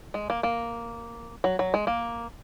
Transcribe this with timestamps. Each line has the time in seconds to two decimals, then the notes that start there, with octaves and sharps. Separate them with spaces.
0.14 G#3
0.30 A#3
0.43 A#3
1.44 F#3
1.59 F#3
1.74 G#3
1.87 A#3